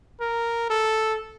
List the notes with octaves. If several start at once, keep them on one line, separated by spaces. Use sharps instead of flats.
A#4
A4